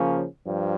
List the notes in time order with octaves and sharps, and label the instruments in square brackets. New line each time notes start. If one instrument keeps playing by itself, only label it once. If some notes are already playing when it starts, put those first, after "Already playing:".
Already playing: [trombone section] C#3 F3 A#3 C#4
G2 F3